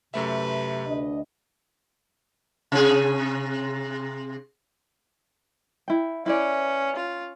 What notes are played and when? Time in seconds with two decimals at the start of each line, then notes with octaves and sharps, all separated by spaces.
0.14 F#2 C3 A3 B4 E5
0.87 D2 D4 D#5
2.72 C3 G#4
5.88 E4 G5
6.26 C#4 E4 B4 D5
6.96 F4